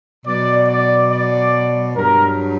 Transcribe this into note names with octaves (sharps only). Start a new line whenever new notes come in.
B2 F#3 D5
D5
D5
G2 F#3 A#4